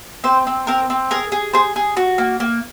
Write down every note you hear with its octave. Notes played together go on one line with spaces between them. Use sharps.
C4 C5
C4
C4 A#4
C4
G#4 A#4
G#4
G#4 C5
G#4
F#4
A#3
A#3